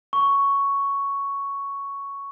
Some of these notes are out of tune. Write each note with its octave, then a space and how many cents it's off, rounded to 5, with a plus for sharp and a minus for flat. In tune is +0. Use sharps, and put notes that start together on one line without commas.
C#6 +5